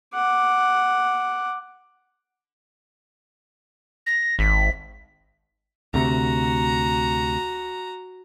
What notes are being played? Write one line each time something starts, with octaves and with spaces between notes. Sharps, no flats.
F#5 D6
A#6
G#1 B6
D2 C3 F#4 A#5